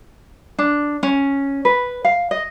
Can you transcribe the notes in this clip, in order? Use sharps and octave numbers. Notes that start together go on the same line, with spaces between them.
D4
C#4
B4
F5
D#5